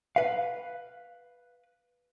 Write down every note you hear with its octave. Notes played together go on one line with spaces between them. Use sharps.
B4 F5